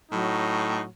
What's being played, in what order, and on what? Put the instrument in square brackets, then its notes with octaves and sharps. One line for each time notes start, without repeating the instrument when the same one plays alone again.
[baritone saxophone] A2 [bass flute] F#3 [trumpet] D#4